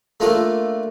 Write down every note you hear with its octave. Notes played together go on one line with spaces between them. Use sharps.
A3 A#3 D4 F4 A4